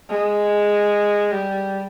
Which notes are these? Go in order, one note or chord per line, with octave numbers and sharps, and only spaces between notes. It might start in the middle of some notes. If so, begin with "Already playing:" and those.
G#3
G3